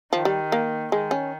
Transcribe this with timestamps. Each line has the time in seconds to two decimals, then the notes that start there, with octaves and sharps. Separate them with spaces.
0.13 D#3 F3
0.25 G3
0.52 A#3
0.92 D#3 G#3
1.11 C#4